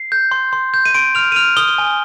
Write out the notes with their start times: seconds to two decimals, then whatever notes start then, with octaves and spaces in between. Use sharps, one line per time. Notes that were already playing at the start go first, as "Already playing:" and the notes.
Already playing: C7
0.12 G6
0.31 C6
0.53 C6
0.74 G6
0.86 D#7
0.94 C6 D7
1.15 F6 F7
1.32 D#7
1.36 F6 F7
1.57 D#6 G7
1.78 G#5